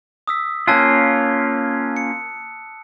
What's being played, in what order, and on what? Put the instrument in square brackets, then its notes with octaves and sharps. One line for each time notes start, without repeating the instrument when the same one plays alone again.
[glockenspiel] D#6 E6 B6
[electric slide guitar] A#3 C#4 F4 [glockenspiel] A5 E6 F#6
[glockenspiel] C#7